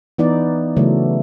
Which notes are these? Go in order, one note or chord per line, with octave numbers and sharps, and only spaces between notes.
E3 B3 D#4 D5
C#3 E3 F#3 A3